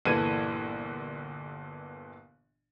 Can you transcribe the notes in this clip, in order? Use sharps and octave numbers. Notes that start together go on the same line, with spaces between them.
G1 A#2 E3 A4 G#6 D#7